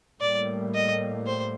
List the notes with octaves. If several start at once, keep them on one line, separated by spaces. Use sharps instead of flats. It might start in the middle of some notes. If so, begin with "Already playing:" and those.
A2 G3 A#3 D5
D#5
C5